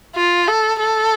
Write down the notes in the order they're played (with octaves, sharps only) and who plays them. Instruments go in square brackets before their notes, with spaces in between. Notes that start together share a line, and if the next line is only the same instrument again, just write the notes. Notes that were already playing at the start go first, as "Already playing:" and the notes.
[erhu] F4
A4
A4